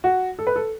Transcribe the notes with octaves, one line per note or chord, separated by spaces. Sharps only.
F#4
A4
B4
A4